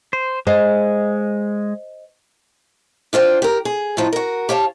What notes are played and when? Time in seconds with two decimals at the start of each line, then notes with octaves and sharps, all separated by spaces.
0.13 C5
0.47 G#3 C5 D#5 F5
3.13 D4 F4 C5 G5
3.42 G4 A#4
3.65 G#4
3.97 A2 C3 F3 D#4 F4
4.13 F#4 A#4
4.49 G4 C#5 F5 A5